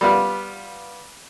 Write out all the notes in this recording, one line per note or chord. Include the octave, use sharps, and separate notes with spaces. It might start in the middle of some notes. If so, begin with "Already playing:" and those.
G3 B3 F4